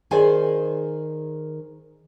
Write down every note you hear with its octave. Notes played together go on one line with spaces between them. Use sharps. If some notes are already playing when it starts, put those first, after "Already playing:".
D#3 G#4 C5 D5 G#5